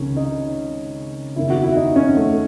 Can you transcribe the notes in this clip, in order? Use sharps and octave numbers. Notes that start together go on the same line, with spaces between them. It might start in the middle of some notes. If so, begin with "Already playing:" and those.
Already playing: C#2 C3 D#3 C#4
D#4
F#1 E2 D#3 E4
F#4
E4
D#4
C#4
A3